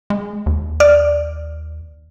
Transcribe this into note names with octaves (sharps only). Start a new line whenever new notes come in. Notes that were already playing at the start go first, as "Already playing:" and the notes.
G#3
D#2
D5 F6